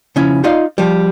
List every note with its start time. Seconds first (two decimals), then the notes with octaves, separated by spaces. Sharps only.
0.16 C#3 F3 C#4 E4
0.44 D#4 F4 D5 D#5 F5
0.78 F3 G3